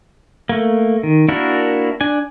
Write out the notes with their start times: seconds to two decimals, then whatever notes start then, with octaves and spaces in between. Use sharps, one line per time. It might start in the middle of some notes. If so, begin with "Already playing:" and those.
0.49 A3 A#3
1.03 D#3
1.29 A#3 D4 E4 F#4 A#4
2.01 D4 G#5